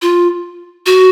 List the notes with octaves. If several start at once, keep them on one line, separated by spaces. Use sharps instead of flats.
F4
F#4